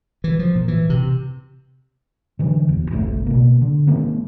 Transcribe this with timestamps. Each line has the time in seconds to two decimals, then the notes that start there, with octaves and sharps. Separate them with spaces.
0.24 E3
0.39 F3
0.55 A#2
0.68 E3
0.90 C3
2.39 D3 E3 F#3
2.69 D#1 E2
2.91 G1 C2 C3 A3
3.27 B2 A#3
3.61 D3
3.87 D#3 G#3 A#3 C4